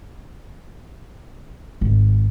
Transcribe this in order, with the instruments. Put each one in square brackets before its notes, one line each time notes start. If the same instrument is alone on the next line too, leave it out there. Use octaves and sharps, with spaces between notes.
[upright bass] G#1